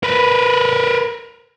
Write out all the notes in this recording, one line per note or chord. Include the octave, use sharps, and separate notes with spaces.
A#4 B4